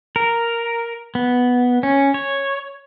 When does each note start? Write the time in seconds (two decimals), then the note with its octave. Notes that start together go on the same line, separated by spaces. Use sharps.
0.16 A#4
1.15 B3
1.83 C#4
2.14 C#5